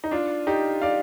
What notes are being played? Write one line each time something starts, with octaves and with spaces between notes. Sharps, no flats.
D#4
D4 F4
D#4 G4
D5 F5